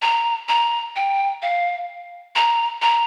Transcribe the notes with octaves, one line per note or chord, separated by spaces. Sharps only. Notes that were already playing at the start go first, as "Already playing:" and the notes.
A#5
A#5
G5
F5
A#5
A#5